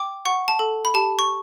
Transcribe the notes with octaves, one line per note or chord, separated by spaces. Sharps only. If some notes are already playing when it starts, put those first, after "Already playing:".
Already playing: G5 D6
F#5 C#6
A5
A4
B5
G4 A5
C#6